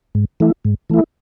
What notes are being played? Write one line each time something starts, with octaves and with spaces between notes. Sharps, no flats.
G#2
E3 A3 E4
G#2
E3 A3 E4